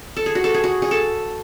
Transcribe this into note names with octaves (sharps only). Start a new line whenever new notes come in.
A4
G#4
F#4
A4
G#4
F#4
G#4
A4